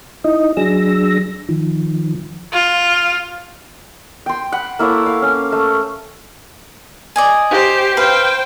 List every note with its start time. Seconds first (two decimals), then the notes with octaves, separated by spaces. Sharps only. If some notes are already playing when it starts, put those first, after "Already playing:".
0.24 D#4 E4 D#5
0.57 F#3 D4 G#4 E6 A#6
1.49 D#3 F3
2.53 F4
4.26 G5 C6
4.52 F#5 B5
4.79 A#3 E4 A4 C#5
5.06 F5
5.22 C#4
5.52 A3
7.16 D5 D#5 G#5
7.51 G4 C5
7.97 B4 C5 F5 G5